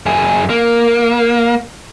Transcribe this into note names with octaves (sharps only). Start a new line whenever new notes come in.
F#2 G#4
A#3